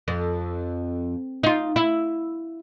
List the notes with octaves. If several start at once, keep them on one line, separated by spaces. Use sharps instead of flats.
F2
D#4 F4
E4